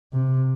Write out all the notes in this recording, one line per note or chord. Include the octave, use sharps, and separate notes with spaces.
C3